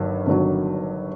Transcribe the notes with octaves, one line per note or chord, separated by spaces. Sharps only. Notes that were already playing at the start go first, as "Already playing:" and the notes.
Already playing: G1 G2 D#3 F#3
G1 G2 D#3 F#3